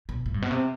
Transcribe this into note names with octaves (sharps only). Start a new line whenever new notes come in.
B2
A2
G2
B2
C3